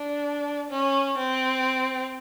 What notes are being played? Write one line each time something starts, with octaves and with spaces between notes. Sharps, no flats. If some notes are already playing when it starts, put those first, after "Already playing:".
Already playing: D4
C#4
C4